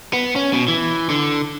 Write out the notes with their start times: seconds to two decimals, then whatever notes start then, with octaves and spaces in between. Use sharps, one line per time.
0.13 B3
0.36 C#4
0.53 B2
0.68 E3
1.10 D3